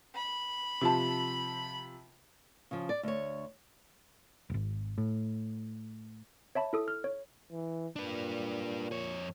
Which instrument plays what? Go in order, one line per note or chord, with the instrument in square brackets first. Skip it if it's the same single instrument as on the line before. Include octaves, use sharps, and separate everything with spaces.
[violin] B5
[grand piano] C3 F3 A5
[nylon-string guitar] C#3 F3
D5
D2 C#5
[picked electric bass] D#1 G#1
A2
[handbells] C#5 E5 A5 B5
E4 A4 D#6
F6
C#5
[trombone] E3
[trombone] A#2 [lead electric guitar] D4 B4
[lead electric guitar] F2 C#5